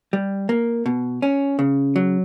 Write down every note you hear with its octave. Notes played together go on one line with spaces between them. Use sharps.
G3
A#3
B2
C#4
C#3
F#3